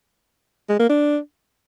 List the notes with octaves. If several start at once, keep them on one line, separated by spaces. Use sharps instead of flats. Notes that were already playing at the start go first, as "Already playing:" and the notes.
G#3
A#3
D4